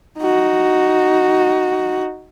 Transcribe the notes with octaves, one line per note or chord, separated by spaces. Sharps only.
D#4 F#4